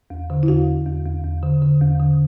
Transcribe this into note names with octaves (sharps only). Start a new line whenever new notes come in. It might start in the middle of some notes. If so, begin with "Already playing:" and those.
E2
D3
E4
E2 F#4
E2
E2
E2
E2
D3
D3
E2
D3